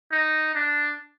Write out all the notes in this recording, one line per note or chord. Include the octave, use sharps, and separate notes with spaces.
D#4
D4